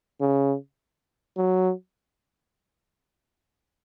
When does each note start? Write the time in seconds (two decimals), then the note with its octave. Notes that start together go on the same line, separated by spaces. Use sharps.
0.21 C#3
1.37 F#3